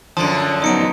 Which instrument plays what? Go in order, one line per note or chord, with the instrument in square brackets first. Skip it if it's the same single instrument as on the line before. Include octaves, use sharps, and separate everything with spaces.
[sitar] F#2 D3 F3 [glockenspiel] A5 C6 D#6
[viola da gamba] F#3 B3 D#4 [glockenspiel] D#6 C#7 D7